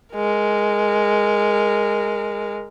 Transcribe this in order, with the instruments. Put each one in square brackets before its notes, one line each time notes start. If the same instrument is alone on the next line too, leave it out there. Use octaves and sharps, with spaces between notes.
[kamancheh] G#3 A#4